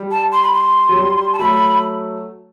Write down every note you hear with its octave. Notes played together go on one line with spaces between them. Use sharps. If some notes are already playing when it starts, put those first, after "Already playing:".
Already playing: G3
A5
C6
B5
C6
F#3
G3
A5
F#3 A3 B5